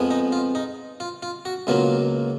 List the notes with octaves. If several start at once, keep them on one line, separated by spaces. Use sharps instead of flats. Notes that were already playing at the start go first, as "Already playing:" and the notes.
Already playing: F2 F3 G#3 B3
D#4
F4
D#4
F4
F4
F#4
C#2 B2 F#3 A#3 F4